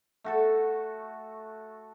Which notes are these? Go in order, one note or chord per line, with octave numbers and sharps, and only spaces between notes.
A3 F#4 A4